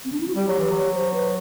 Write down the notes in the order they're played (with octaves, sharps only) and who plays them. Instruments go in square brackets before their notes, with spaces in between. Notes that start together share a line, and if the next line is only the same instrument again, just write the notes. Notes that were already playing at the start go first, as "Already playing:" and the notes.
[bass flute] C4
D4
E4
F#4
[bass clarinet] G3 [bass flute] G4
[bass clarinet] F#3
E3
F#3
[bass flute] C5
B4